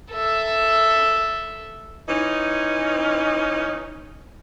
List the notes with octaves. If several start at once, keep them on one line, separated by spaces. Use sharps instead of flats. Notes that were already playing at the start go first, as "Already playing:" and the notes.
A4 E5
E3 C#4 D#4